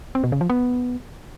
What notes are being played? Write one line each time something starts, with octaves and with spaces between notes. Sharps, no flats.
C4
B2
C#3
F3
B3